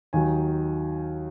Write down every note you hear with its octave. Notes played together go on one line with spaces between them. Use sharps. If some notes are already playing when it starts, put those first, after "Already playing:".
D#2 D#3 F#3 G#5